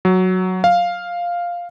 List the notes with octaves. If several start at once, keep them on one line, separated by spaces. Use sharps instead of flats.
F#3
F5